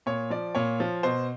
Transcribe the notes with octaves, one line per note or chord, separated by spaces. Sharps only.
A#2 C#5
F3 D5
A#2 C#5
F3
B2 C5